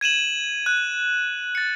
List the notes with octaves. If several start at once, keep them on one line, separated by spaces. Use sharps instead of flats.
G#6 D#7 E7 F#7
F#6
A6 C#7